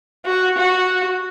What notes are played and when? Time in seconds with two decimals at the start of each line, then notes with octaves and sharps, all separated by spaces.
0.26 F#4
0.58 F#4